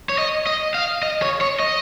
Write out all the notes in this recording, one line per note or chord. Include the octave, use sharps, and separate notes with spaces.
C#5
D#5
D#5
F5
D#5
C#5
C#5
D#5